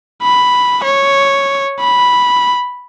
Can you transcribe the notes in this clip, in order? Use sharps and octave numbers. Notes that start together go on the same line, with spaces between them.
B5
C#5
B5